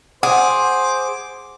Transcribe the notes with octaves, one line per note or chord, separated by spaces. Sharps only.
G#4 C5 F#5 D6